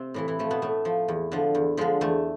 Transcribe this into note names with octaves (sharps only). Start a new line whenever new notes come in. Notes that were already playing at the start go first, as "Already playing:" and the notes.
Already playing: C3 C4
A2 E3 E4
E3 E4
F3 A3
B2 B3
A2 A3
F3
E2
D3 F3
E2
D3 F3 G#3
E2 A3